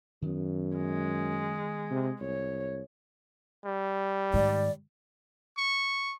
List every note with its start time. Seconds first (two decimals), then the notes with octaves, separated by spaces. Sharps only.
0.22 F#2 D#3 B3
0.77 G#3
1.91 C3
2.21 C2 C#5
3.65 G3
4.34 G#2 D#3 D5
5.57 C#6